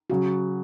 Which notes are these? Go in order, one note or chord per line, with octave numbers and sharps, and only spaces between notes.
C#3 F#3 F#4